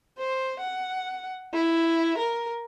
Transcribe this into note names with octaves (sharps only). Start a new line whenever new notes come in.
C5
F#5
E4
A#4